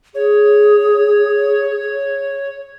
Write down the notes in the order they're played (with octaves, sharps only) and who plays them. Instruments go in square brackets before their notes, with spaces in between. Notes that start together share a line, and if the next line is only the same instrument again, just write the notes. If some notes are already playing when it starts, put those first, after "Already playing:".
[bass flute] G#4 [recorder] C#5